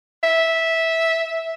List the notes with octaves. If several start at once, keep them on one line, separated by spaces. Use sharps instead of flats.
E5